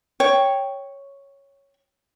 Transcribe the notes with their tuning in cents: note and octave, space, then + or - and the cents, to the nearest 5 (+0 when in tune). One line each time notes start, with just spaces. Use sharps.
C#5 +0 G5 +0